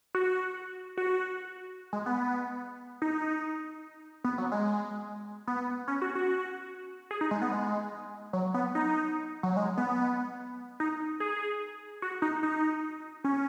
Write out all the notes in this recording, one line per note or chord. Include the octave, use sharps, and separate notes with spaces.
F#4
F#4
G#3
B3
D#4
B3
F#3
G#3
B3
C#4
F#4
F#4
G#4
D#4
G#3
B3
G#3
F#3
B3
D#4
F#3
G#3
B3
D#4
G#4
F#4
D#4
D#4
C#4